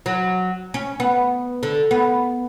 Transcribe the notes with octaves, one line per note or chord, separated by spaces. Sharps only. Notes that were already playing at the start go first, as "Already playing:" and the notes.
F#3
C#4
B3
D3
B3